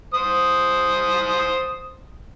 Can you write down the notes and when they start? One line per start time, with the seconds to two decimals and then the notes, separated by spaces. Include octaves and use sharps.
0.14 C5 D#6